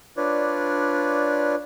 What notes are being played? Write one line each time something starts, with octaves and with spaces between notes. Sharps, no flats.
D4 F4 B4 C#5 D5